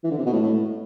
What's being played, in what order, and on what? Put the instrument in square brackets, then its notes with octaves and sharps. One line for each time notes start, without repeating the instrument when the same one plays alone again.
[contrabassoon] E3
D3
C3
B2
A2
A2
A2